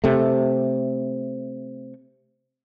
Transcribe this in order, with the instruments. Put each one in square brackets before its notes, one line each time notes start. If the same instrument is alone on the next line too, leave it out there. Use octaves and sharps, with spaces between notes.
[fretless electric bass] C3 A3